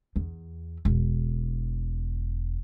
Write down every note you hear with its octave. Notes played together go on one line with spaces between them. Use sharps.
E2
E1